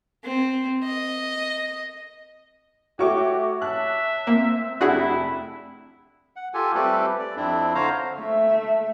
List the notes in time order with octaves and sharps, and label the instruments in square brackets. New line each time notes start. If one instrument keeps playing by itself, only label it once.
[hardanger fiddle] C4
D#5
[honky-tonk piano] A3 F#4 [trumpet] G4 [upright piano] C#5 C#6 D6
[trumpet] E5 [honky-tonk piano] A5 F#6
[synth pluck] A#3 [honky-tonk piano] C4
[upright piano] F1 A3 F#6 [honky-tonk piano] D4 [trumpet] E4 [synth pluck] F#4 G#4 F#5
[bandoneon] F#5
F4 G4 A4 G#5
G3 A3 C4 G4 A4 B4
D5
F2 C4 D4 E4
D3 C5 C#5 F5 A#5
[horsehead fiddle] A3 E5